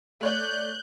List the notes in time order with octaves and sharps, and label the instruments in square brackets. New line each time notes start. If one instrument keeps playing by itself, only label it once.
[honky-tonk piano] A3 C#5 D5 [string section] F#6 G6